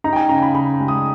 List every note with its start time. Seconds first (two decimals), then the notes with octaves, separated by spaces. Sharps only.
0.04 D#4 A#5
0.13 G5
0.16 G#5
0.29 C#3 A#5
0.42 B5
0.54 C#3 B5
0.80 G#3
0.88 D#6